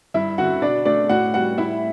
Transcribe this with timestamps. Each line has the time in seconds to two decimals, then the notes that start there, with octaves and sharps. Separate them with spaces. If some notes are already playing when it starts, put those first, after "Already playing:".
0.14 G2 E4 E5
0.38 D3 F#4 F#5
0.62 B2 D4 D5
0.85 A3 D4 D5
1.09 A2 F#4 F#5
1.34 G3 F#4 F#5
1.58 A2 E4 E5